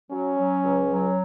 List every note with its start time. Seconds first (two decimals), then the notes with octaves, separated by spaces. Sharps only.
0.11 F#3 C#4
0.38 F#3
0.64 C#2
0.91 F#3